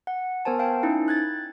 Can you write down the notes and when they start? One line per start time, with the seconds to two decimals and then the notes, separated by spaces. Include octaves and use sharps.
0.07 F#5
0.45 B3 A#4 C5 G#5 A5
0.59 F5 G5 A5
0.83 C#4 D#4 E4
1.08 F#6 G#6 A6